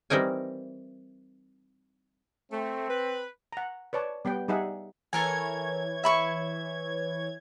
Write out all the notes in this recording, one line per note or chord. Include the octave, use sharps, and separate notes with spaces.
E3 G3 C4 D#4 A#4 G#5
A3 C4
B4
F#5 A#5
B4 C#5 D5 A5
G3 B3 B4 G5
G3 D#4 G#4 E5 F#5
E3 A4 A#4 C#5 G#5 G#6
E5 B5 C#6